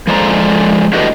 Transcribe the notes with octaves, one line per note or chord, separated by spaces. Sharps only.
F3 G#3 A4 C5 D5 A#5
A2 D4 F#4 G4 B4 D#5